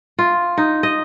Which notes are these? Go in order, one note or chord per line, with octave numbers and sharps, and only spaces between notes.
F4
D#4
D#5